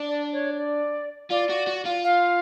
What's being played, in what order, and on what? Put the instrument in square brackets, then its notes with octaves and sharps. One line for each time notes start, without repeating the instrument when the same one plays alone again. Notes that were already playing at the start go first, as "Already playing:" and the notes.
Already playing: [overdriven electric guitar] D4
[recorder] D5
C#5
D5
[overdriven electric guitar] F4 [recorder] D5
[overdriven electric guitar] F#4
F#4
F4
[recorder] F5